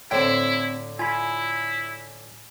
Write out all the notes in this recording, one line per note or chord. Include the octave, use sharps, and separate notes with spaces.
A2 D3 C4 E4 C5 G5
E4 F4 G#5 B5